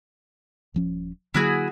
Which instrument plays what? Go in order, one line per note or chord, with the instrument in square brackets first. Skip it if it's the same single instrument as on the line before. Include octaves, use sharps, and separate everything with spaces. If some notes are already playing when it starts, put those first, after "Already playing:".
[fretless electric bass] D#1 F3 C#4
[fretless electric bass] D3 F#3 A#3 [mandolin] E4 F#4 G#4